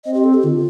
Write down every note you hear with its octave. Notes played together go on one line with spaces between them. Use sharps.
C4 D#5
G4
A4
G4
D3 F4